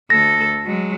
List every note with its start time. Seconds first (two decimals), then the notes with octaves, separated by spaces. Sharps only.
0.10 D2 A4 A#6
0.66 F#3 G#3